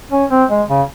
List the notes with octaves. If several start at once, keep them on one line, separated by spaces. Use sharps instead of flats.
C#4
C4
G#3
C#3